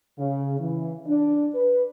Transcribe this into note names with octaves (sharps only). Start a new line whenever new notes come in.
C#3
E3
D4
B4